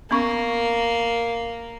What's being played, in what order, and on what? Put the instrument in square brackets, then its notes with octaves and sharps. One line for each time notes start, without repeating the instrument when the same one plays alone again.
[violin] A#3 [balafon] B3 C#4 C#6